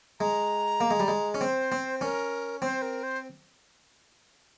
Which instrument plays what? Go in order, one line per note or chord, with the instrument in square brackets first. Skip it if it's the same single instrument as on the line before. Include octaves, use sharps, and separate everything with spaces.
[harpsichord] G#3 [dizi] A#5
[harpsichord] A#3
G#3
G3
G#3
C#4
[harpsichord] C4 [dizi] C5
[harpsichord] C4
[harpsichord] C#4 [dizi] A#4
[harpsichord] C4 [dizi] C5
[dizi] A#4
C5